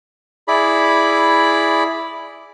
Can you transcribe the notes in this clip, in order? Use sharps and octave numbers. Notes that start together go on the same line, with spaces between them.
E4 G#4 D5 B5